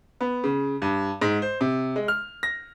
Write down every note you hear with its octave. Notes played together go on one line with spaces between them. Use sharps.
B3
C#3
G2
G#2
C5
C3
G#3
F6
A#6